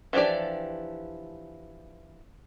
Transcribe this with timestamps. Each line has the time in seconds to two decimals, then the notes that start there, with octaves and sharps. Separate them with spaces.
0.13 E3 F3 D4 G4 D5